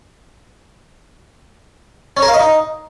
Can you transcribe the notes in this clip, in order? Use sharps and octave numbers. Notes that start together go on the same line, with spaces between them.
C#4
A#4
F5
D#5
D#4